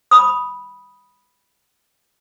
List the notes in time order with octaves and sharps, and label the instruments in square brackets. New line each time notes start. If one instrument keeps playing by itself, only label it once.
[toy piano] B5 D#6